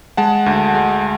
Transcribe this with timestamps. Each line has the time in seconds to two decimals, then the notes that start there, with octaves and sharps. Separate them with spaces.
0.17 G#3 F#5 A5
0.46 D2
0.75 G#3